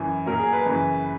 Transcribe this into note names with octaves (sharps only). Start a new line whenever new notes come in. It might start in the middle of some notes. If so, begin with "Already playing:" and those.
Already playing: F#2 E3
A#2 F#3 A#4
G#4
B4
F#2 C#3 E3